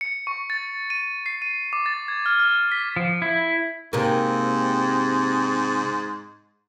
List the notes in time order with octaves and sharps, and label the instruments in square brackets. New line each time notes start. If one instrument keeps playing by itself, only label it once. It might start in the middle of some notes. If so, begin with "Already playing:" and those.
[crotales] C#7
C#6
A6
D#7
C7
D#7
D6
A6
G#6
F6
F6
B6
[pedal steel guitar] F3
E4
[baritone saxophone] G#2 [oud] C3 A#3